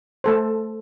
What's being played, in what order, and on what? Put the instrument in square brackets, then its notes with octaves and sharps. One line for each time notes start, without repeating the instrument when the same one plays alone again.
[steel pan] A3 A4 C5